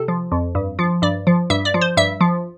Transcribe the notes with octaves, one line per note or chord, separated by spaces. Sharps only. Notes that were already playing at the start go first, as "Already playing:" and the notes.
Already playing: C3 A4
F3
F2
G2
F3
G2 D5
F3
G2 E5
D5
F3
C5
G2 E5
F3